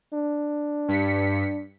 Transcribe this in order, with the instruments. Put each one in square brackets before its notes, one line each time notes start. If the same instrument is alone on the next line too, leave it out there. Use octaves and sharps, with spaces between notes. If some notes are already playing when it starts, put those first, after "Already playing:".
[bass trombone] D4
[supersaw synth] G2 B6 C#7